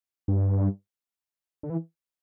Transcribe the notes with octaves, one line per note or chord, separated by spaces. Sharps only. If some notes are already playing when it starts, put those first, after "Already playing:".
G2
D3
E3